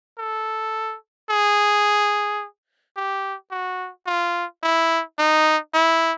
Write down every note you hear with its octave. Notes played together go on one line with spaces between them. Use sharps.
A4
G#4
G4
F#4
F4
E4
D#4
E4